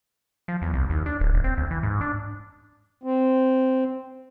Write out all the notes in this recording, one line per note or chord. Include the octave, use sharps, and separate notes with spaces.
F3
E2
C2
D#2
D4
D1
D#1
C4
D2
E3
G#2
D4
C4